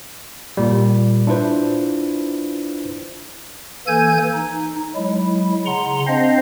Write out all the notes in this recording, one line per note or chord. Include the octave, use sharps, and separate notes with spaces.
A#2 G3
D4 E4 F4 B4 C5
E3 A#3 A4 G#5 G6 G#6
D#4
F#3 G#3 E4
C#3 F#5 A#5 C6
C4 D4 C5 D#5 F5